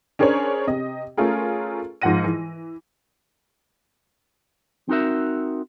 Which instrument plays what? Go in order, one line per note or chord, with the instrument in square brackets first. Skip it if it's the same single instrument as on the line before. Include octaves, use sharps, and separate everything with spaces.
[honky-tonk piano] C#4 D4 G#4 A#4 C5 C#5
C3 D#5
A3 C#4 F4 G#4 A#4
G#2 F3 F4 F#5 A#6 D#7
E3
[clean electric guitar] C4 D#4 F#4 A#4 E5